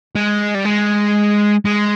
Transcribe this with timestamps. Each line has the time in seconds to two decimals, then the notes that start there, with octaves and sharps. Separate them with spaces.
0.15 G#3
0.55 G3
0.65 G#3
1.65 G#3